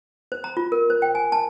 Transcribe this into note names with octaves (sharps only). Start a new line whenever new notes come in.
C5
A#5
F4
A#4
C5
G5
G#5
A5